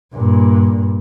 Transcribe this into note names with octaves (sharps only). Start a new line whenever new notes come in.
G2 A#2